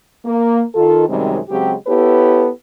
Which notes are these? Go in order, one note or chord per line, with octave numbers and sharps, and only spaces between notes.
A#3
D#3 F4 A4
F#2 C3 D#3 G3 G#3 C4
C#3 F#3 G#3 C4 G4
B3 E4 G4 A4 B4 C#5